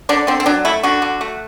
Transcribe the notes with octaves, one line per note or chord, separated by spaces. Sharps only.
D3 D4
D3 C4
C4
F#3 D4
A3 E4
D3 F#4
D3
A3